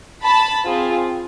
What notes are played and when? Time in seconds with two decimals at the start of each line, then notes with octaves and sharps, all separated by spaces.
0.23 A5 B5
0.64 C4 F4 G#4